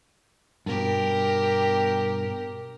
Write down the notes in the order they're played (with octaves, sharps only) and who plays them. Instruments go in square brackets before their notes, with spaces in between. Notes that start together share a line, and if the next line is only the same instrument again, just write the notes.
[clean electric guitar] G2 B2 [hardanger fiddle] G4 A#4